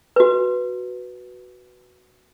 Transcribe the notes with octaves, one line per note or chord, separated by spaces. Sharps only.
F#4 B4